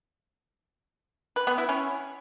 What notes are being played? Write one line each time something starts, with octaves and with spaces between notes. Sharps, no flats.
B4
B3
E4
C#4